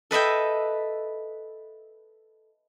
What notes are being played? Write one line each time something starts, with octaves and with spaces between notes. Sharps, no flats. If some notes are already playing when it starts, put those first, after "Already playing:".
A4 B4 D#5 E5 G5